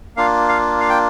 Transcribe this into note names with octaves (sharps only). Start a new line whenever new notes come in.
A#3 D4 F4 F5
F5
F5
G5